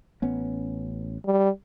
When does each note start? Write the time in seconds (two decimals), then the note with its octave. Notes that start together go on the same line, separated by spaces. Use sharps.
0.22 A1 B3 C#4
1.26 G3